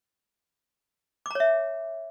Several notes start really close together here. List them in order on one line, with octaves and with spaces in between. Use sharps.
D6 A#5 C#5 E5